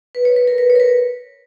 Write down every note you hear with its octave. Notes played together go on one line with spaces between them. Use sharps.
B4
C#5
B4
A#4
B4
C#5
A#4
B4